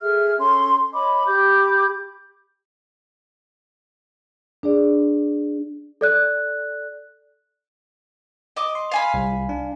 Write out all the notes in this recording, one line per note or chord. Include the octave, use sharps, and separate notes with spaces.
G#4 A4 E5 F6
C#4 A4 C6
C#5 D#5 B5 D6
G4 B5 D6 G6
D4 G#4 D5
A4 D5 F#6
D#5 D6
C6
F5 G#5 B5
C2
D4